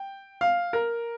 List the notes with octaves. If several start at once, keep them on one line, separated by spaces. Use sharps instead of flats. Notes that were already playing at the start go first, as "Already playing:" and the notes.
Already playing: G5
F5
A#4